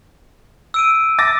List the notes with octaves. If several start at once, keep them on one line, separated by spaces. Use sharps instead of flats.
E6 D7 D#7
D6 A6 A#6